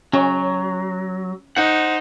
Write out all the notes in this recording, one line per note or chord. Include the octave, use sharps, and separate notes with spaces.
F#3 C#4
D#4 C5 F#5